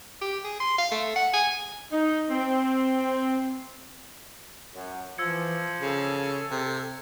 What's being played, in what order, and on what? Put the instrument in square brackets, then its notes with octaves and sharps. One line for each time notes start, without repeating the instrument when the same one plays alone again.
[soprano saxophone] G4
G#4
C6
F5
A3
F#5
G#5
[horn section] D#4
C4
F#2
[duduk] E3 [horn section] F3 [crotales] E6 G#6 C#7
[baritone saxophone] C#3 [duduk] A4
[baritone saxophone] C3